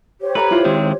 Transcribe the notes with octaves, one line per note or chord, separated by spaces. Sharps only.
G4 C5 C#5
A4 B4 A#5 B5
E4 F4
D#3 G#3 C4